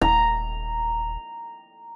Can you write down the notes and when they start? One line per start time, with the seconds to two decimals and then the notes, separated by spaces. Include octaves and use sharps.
0.01 D#1 A#5